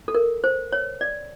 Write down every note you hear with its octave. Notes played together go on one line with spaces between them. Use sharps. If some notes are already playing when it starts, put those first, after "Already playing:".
A4
A#4
C5
C#5
D5